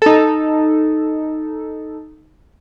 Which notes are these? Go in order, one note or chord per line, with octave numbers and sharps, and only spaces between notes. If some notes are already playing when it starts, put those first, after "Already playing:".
D#4 A4